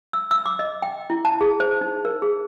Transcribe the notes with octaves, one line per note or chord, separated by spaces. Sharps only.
E6
E6
D6
D#5
G5
E4
A5
G#4
C5
D#4
A#4
G#4